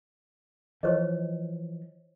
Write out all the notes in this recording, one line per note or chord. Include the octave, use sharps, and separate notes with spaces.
E3 F3 C5 C#5 D#5